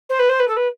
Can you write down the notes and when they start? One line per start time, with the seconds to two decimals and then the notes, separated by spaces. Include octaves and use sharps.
0.10 C5
0.19 B4
0.29 C5
0.40 B4
0.48 A4
0.57 B4